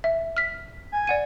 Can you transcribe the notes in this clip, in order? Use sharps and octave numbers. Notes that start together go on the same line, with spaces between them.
E5
F6 B6
G#5
D5 F#5 D#7